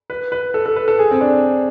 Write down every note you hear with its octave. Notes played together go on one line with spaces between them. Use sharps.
B4
B4
A4
A4
B4
A4
G#4
C4
D4